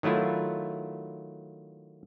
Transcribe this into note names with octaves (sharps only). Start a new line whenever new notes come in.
D#3 F#3 A3 E4 F4